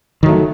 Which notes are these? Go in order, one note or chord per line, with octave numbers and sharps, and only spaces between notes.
D#3 F#3 A3